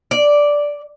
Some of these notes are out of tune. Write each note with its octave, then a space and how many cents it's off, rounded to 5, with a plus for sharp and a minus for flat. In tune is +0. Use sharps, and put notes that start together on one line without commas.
D5 -5